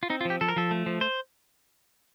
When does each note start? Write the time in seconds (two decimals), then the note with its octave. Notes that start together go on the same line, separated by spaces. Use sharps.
0.03 F4
0.10 C4 D#4
0.21 F4
0.25 F3 G4
0.41 F3 A4
0.48 A#4
0.56 F3 A4
0.71 A3
0.86 F3
1.01 C5